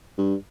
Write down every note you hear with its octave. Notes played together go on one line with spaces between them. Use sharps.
G2